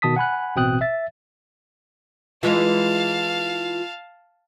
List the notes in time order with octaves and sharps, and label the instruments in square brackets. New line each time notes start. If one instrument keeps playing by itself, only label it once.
[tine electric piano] B2 D#3 A5 D#6 B6
F#5 G#5 B5 F#6
A1 B2 C4 G5 D#6 F#6
E5 A6
[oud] E3 G#3 [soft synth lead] F4 [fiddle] F5 A5